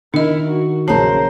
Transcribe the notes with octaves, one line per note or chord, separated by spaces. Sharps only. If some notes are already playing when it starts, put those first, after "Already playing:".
D#3 D4 E4 A#4 D#5
F#4
A#1 C#3 F#3 A#4 C5 A5 C7